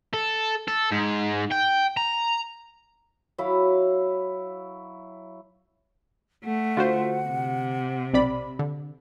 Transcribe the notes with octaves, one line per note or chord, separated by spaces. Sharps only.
A4
A4
G#2
G5
A#5
F#3 E4 F5 B5
A3 F#5
D3 F4 F#4 C5
C3
B1 C4 D5 B5
D3